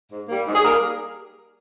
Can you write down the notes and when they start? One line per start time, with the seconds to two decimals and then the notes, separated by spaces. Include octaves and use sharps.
0.10 G#2
0.27 G3 A#3
0.45 G#2
0.54 G#4
0.63 G3 A#3 A#4